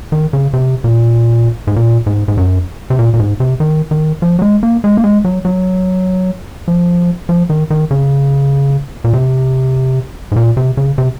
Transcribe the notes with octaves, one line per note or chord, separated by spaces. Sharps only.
D#3
C#3
C3
A#2
G#2
A#2
G#2
G#2
F#2
C3
A#2
A#2
G#2
C3
D#3
D#3
F3
F#3
G#3
A#3
G#3
A#3
G#3
F#3
F#3
F3
F3
D#3
D#3
C#3
A#2
C3
G#2
A#2
C3
C#3
C3